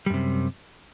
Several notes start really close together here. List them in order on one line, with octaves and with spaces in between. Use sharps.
G3 F#2 C3